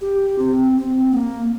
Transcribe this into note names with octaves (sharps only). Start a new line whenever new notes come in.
G4
C4
C4
A#3